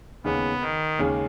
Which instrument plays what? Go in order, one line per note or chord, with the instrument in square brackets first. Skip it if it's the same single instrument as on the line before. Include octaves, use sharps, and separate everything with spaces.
[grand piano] D#2 C#3 G#3 C#4 [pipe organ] B3
[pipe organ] D#3
[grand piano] D#2 C#3 G#3 C#4